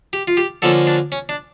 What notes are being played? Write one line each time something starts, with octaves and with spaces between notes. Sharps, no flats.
G4
F4
G4
D3 F3 A#3 C#4 A4
D4
C#4
D4